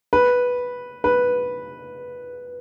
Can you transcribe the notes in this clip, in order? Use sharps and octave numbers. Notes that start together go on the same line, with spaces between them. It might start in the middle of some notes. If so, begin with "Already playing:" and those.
B4
B4